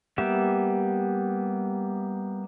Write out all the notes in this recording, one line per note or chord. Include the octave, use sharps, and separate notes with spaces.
G3 A#3 B3 G4 E5